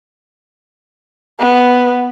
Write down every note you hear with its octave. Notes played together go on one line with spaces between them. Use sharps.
B3